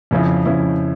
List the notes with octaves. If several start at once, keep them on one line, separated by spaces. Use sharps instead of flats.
F2 C#3 F3 C#4 E4
F2 C#3 F3 C#4 E4